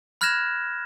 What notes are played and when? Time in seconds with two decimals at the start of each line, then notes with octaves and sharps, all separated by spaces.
0.21 B5 F6 F#6 G#6 A#6 E7